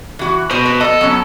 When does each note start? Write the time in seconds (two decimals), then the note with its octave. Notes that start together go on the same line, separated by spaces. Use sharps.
0.19 E3 F#4
0.51 B2 C5
0.65 B4
0.81 B3 A4 D#5
1.01 F#3 B3 C#4